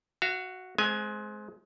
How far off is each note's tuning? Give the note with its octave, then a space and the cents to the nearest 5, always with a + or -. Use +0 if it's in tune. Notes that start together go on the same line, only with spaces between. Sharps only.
F#4 +0 F5 -40
G#3 +25 C4 -5 G#5 +0